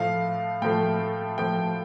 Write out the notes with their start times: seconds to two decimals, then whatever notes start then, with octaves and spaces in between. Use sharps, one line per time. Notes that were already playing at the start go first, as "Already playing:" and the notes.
Already playing: A2 F3 A3 F5
0.62 A2 F3 A3 G5
1.38 A2 F3 A3 G5